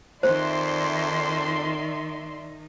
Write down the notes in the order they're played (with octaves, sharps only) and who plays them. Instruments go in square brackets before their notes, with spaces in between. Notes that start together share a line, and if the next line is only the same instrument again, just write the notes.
[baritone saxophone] F2 [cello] D#3 D#4 [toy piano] C5 [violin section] D5 E5 C6